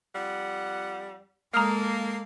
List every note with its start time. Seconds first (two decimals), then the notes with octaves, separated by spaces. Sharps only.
0.14 F2 G3 F#5
1.54 G#3 A#3 A4 A#5 D#6 F6